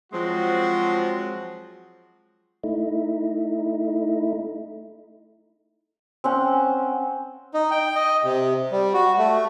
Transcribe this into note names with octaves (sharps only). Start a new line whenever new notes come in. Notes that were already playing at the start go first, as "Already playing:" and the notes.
F3 F#3 G#3 C4 F#4
A3 D#4 E4
C4 C#4 F#5
D#4
G5
D#5
C3
G3
F#4
A3